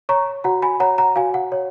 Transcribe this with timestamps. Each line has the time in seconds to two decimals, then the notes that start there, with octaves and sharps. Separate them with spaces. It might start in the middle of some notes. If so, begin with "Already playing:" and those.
0.09 C#5 A#5 C#6
0.44 F#4 F#5 A#5
0.62 G#5 B5
0.80 C#5 F#5 A#5
0.98 F#5 A#5
1.16 F#4 F5 G#5
1.34 F#5
1.52 C#5